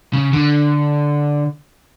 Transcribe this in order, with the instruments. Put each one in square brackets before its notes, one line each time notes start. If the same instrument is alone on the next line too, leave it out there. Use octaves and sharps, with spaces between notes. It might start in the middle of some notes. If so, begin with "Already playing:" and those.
[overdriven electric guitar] C#3
D3